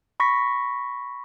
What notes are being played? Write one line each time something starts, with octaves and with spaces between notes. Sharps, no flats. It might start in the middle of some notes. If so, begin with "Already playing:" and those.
B5 C#6 A#6 B6